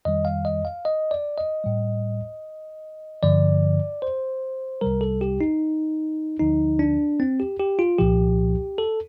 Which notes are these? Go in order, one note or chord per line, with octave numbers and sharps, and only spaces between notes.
F2 D#3 G3 D#5
F5
D#5
F5
D#5
D5
D#5
A2 G3
G2 D3 F3 D5
C5
C2 C3 G3 A#4
A4
G4
D#4
D2 D3 F3 D#4
D4
C4
G4
G4
F4
C2 A#2 F3 G4
A4